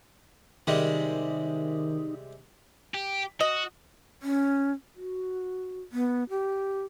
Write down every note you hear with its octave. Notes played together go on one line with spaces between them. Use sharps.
C3 D#3 G3 G#3 D#4
G4
F#4 D#5
C#4
F#4
B3
G4